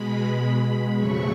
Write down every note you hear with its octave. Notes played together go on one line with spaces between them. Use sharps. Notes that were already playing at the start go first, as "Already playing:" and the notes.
Already playing: B2 G#3 B5
F2 C#3 F#3 A3 C#6